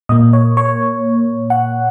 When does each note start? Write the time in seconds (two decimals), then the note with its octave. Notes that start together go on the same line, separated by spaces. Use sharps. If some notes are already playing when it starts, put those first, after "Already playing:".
0.09 A#2 A#3 D#5
0.33 C#5
0.57 C#5
1.50 F#5